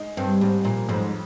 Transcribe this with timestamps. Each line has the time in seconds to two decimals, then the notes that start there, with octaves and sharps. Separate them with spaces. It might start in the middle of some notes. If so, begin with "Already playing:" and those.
Already playing: G#3 D#4
0.17 G2 C4
0.41 G#2 G3
0.65 A#2 F3
0.89 F2 G#2